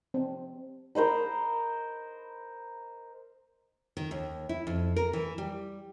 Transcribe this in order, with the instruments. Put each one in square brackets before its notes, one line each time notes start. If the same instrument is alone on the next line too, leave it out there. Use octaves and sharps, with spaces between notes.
[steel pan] C4
[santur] A#4 C5 D#5 B5
[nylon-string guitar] D#3
D#2
E4
F2
A#4
E3
G3